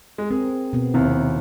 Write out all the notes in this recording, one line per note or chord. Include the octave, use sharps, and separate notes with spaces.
G#3
C4 G#4 A#4
B2 B3 C4
D#2 C3 E4